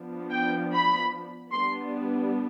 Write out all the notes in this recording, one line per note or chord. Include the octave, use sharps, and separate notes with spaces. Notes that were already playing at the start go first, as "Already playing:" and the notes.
Already playing: F3 B3 D4
G5
B5
G3 B3 D4 C6